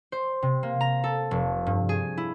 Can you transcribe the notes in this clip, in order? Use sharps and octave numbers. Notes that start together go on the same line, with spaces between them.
C5
C3
A#3
A#5
A4
F1
G2
G#4
E4